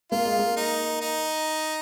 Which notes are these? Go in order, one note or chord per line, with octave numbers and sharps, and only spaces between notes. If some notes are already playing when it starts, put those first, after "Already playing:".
A#3 F4
G#3
A#3
D#4
D#4